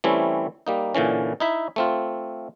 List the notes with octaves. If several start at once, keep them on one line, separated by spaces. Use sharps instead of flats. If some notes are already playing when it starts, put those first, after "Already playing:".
E3 G3 A3 C4 C#4 E4
G3 A#3 D#4
A#2 D3 E3 C#4
D#4 E4 E5
A3 C4 F4